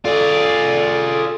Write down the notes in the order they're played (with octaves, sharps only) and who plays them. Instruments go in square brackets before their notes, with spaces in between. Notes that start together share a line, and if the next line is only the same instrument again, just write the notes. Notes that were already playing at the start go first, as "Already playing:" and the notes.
[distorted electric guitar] F4 G#4 [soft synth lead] A4 [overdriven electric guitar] D5